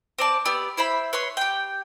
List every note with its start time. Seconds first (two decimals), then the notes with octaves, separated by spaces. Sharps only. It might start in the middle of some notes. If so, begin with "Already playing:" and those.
0.18 C4 D5 A5
0.45 B3 G4 D5 E6
0.77 E4 C5 E5 B5
1.13 B4 C#5 C6
1.37 G4 G5